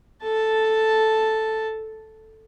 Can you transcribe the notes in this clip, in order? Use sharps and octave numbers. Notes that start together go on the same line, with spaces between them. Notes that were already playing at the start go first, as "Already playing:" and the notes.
A4 A5